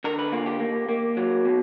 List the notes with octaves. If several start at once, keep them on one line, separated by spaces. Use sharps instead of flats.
D3 A#4
B4
A#3 F4
G4
A#3
A#3
F#3
B2